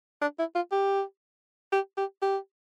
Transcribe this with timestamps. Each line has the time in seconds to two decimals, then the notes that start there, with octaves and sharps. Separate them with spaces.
0.21 D4
0.39 E4
0.55 F4
0.72 G4
1.72 G4
1.97 G4
2.22 G4